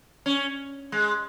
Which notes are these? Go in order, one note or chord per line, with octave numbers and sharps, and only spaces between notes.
C#4
G#3